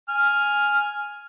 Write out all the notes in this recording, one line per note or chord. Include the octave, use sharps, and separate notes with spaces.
G#5 F6